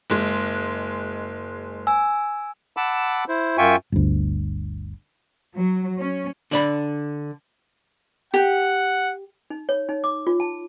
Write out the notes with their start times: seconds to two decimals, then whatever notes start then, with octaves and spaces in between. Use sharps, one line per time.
0.10 F#1 G#3
1.87 G#5 E6
2.77 F#5 A5 B5 D6 E6
3.28 E4 C5
3.58 F#2 F4 E5 G5 G#5 C#6
3.92 G1 D2
5.56 F#3
5.98 C#4
6.51 D3 D5 B5
8.34 G4 F#5
9.50 D#4
9.69 C#5
9.89 D#4
10.04 D6
10.27 F4
10.40 A5